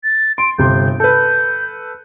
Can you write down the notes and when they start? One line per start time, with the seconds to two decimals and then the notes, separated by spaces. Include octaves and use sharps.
0.04 A6
0.38 C6 D7
0.58 G1 C3 C6 G6
1.00 A4 B4 G6